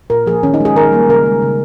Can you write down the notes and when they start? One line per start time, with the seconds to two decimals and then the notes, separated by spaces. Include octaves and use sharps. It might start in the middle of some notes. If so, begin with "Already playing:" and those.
0.10 A#2 A#4
0.26 F3 A#3 G#4
0.43 D#3 C#4
0.54 D#4
0.60 G#3 G#4
0.76 D#3 A#4
0.92 G3 A#3
1.09 C#3 A#4
1.26 G#3
1.42 C#3